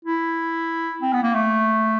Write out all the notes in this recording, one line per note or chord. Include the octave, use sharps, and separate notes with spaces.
E4
C4
B3
A#3
A3